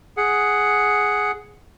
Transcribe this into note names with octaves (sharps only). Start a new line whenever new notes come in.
G#4 F#5